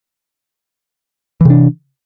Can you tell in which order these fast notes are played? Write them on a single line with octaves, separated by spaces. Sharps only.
E3 C3 D4